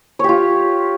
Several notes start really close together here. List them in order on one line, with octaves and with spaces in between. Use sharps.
C#5 G4 F4